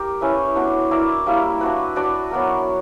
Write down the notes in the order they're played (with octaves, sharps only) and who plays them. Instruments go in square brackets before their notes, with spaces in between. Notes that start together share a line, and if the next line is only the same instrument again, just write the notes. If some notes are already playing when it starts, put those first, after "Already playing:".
Already playing: [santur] G4 A#4
C#4 E4 B4 E5
B3 D4 F#4
E4 A#4 D5
G3 A#3 E4
D4 F#4 B4
D4 F#4 B4 D5
F#3 B3 F#4 A#4